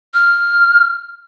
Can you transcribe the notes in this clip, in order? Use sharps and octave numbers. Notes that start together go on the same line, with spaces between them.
F6